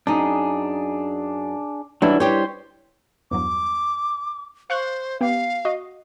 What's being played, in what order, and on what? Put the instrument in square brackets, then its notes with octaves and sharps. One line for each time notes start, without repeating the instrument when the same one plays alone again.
[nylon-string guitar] F#2 D#4 [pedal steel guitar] D4 G#4
[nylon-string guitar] E3 D4 [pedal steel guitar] F#3 G3 E4
[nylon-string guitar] G3 G4 C#5 [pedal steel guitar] C5
[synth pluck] E2 G2 F#3 [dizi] D6
[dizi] C5 [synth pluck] F5 C#6 F#6
[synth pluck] B3 G4 [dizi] F5
[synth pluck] F#4 D#5